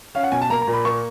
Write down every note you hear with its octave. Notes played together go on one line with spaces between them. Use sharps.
C#4 F5
F#5
B2 G#5
A5
A#3 A#5
A#5
A#2
B5
A#3 C#6